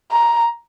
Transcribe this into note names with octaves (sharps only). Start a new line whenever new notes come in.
A#5